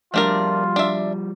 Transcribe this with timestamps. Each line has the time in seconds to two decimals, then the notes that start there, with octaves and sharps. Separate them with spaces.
0.14 F3 G3 A3 D4 F4 A#4
0.76 D4 E5